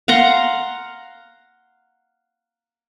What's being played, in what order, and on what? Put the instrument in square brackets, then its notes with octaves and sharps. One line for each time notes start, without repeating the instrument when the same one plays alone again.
[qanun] F5 F#5 A#5 C6